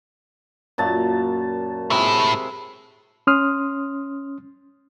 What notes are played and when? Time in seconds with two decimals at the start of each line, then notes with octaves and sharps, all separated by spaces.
0.78 F#2 A#2 A5
1.90 C3 G#3 A3 E4 E5
3.27 C#4 C6 D#6 F6